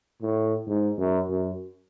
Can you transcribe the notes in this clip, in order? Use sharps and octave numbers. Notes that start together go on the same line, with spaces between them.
A2
G#2
F#2
F#2